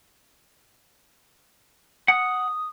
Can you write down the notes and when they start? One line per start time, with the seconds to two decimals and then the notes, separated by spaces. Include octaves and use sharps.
2.08 F#5 D#6